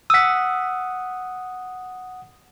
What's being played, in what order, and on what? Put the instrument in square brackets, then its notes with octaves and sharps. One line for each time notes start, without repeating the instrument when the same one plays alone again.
[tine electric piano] F#5 D#6 [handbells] E6 B6